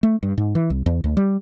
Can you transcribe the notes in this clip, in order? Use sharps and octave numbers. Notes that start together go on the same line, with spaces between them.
A3
G2
G#2
E3
C2
E2
D2
G3